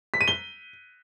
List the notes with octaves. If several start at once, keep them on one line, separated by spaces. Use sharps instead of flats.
B6
D#7
G7